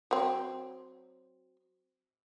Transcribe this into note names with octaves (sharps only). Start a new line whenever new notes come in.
F#3 C4